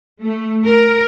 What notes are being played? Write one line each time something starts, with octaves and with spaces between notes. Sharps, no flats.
A3
A#4